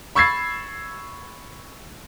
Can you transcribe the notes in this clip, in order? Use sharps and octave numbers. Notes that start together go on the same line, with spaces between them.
B5 C#6 E6 G#6 A6 C7